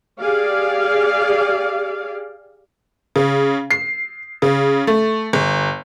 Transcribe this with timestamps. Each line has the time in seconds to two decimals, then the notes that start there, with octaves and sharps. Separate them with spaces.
0.19 G4 G#4 D5 F5
3.16 C#3
3.71 C7
4.42 C#3
4.87 A3
5.33 G1